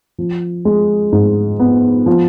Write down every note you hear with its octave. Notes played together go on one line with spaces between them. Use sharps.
F3
G#3
G#2
B3
F3